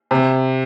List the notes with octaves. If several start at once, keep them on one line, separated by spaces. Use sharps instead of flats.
C3